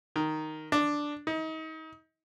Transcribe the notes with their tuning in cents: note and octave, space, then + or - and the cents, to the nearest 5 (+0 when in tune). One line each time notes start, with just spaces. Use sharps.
D#3 -5
D4 +0
D#4 +35